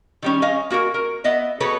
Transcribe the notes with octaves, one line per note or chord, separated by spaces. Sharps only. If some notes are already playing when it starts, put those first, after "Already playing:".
D#3 G3 C#4
C#4 D#5 F5 G#5
A#3 F#4 G#4 A#4
A#4
B3 D#5 E5
F#4 G#4 A4 B4 C#5